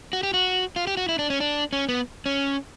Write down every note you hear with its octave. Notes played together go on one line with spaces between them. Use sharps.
F#4
G4
F#4
F4
G4
F#4
E4
D4
C#4
D4
C#4
B3
C#4